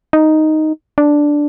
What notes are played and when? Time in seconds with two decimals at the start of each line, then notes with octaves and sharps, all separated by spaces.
0.13 D#4
0.98 D4